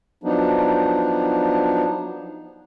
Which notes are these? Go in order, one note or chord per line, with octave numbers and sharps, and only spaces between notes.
F3 F#3 B3 D4 D#4